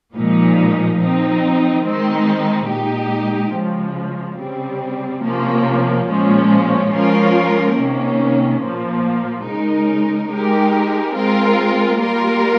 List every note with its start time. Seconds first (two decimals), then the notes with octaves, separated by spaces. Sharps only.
0.16 A#2 F3 G#3 D#4
1.00 F3 C4 D#4
1.84 D#3 G#3 C4 D#4
2.69 A#2 G#3 D#4 G4
3.54 C#3 F3 G#3
4.39 C#3 G3 C4
5.22 C3 F3 A#3 C#4
6.07 A#2 F3 G#3 C#4
6.92 F3 G#3 C#4 F4 A#4
7.77 C3 D#3 A#3 C#4
8.61 A#2 F3 A#3
9.46 C#3 G#3 D#4 A#4
10.30 G#3 D#4 G4 A#4
11.15 G#3 C4 F4 A#4
12.00 G3 A#3 F4 A#4